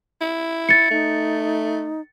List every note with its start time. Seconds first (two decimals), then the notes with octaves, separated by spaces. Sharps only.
0.21 E4
0.69 A6 C#7
0.91 A3 D#4